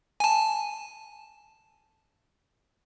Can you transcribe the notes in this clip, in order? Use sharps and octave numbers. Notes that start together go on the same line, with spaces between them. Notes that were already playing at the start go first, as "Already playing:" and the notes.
G#5 A5